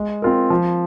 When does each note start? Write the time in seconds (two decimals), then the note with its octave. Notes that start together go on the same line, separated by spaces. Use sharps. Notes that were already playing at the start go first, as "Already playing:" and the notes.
Already playing: G#3
0.22 C4 F4 A#4
0.50 F3